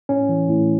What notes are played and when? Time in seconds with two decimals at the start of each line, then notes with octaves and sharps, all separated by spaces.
0.09 A2 C#4
0.29 E3
0.49 A2